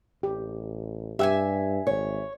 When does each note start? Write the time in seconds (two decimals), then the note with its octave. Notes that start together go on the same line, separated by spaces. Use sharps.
0.23 A1 G4
1.19 G2 G4 E5 F#5 G#5 E6
1.87 G#1 C#5